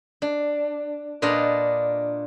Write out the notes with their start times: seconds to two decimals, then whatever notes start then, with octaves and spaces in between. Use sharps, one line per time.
0.22 D4
1.22 A#2 D4 F4 B4 D#5 A#5